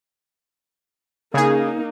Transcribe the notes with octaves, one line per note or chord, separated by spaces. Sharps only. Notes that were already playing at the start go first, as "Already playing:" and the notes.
C#3 A#3 D#4 G#4